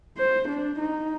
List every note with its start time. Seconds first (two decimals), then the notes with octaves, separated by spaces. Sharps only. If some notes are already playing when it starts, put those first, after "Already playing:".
0.17 C5
0.48 D4
0.79 D#4